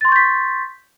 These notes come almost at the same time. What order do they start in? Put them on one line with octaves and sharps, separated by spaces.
A6 C6 C#6 G6 B6